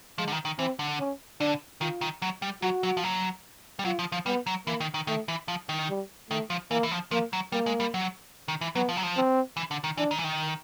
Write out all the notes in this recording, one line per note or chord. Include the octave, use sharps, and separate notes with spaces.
F3 G#3
D3
D#3
D#3
E3 C4
D3
C#4
D3 D4
D#3 F4
D#3
F#3
G3
F#3 F#4
F#3
F3
F#3
G3
F#3 F4
F3
F3
G3 B3
F#3
E3 A#3
D#3
D#3
D#3 A3
E3
F3
D#3
G3
D#3 A3
F3
E3 A#3
E3
F3
F3 A#3
F#3
G3 A#3
G#3
G3
F#3
D#3
E3
F#3 B3
F3
F#3
F3
C4
E3
D3
D#3
E3 D4
D#3
E3
D#3